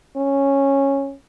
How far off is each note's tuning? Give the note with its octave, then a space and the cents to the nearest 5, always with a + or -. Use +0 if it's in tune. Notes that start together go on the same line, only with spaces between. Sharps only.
C#4 -10